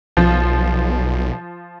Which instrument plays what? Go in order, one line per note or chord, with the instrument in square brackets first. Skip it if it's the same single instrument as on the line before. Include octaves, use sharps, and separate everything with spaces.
[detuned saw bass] B1 [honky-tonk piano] F3